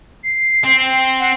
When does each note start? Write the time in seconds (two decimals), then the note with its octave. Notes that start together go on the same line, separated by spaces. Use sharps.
0.24 C7
0.64 C4
1.20 F#5